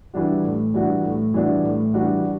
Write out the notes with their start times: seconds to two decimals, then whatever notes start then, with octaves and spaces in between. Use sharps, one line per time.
0.14 E3 G3 D4 F#4
0.43 A2
0.74 E3 G3 D4 F#4
1.04 A2
1.34 E3 G3 D4 F#4
1.63 A2
1.94 E3 G3 D4 F#4